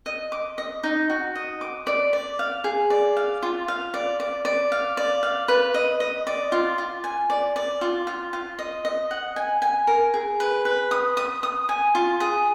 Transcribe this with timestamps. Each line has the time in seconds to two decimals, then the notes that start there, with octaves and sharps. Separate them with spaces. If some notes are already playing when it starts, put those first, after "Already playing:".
0.06 D#5
0.32 D6
0.58 D#5
0.83 D#4
1.10 F#4
1.35 D#5
1.61 D6
1.87 D5
2.13 D5
2.39 F5
2.64 G#4
2.90 D5
3.17 F5
3.43 F4
3.68 F5
3.94 D5
4.20 D5
4.45 D5
4.72 F5
4.97 D5
5.23 F5
5.48 B4
5.74 D#5
6.00 D#5
6.27 D5
6.52 F4
6.78 F4
7.04 G#5
7.30 D5
7.56 D5
7.81 F4
8.07 F4
8.33 F4
8.59 D#5
8.85 D#5
9.11 F#5
9.36 G#5
9.62 G#5
9.87 A#4
10.14 G#4
10.40 B4
10.65 B4
10.91 D#6
11.17 D#6
11.43 D#6
11.69 G#5
11.95 F4
12.20 G#4